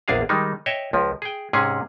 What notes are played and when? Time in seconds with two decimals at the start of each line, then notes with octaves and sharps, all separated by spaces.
0.08 A#1 E2 D4 G#4 F5
0.29 D#3 G3 G#3 D#4
0.66 C#5 D#5 E5 G5
0.93 C#2 F3
1.22 G#4 G5
1.53 G#2 C3 C#4 G#4